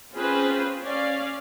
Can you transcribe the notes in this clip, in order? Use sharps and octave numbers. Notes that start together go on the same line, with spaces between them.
C4 C#4 F4 G#4 B4 C5
C#4 D5 F5